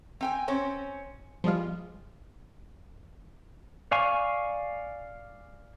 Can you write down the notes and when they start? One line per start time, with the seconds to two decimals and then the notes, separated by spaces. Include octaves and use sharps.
0.21 C4 G5 G#5
0.48 C4 C#4 C#5
1.44 F3 G3 G#3 F4
3.91 D5 F5 G#5 C#6